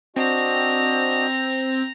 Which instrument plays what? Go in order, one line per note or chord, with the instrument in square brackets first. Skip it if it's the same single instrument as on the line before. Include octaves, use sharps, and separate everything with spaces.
[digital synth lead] C4 [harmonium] D4 F#4 D#5 [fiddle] A#5